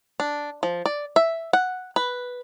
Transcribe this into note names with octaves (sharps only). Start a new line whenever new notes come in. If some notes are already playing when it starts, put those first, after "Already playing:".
D4
F3
D5
E5
F#5
B4